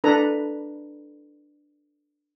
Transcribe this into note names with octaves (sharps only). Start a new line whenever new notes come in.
D4 A4 B4 A#5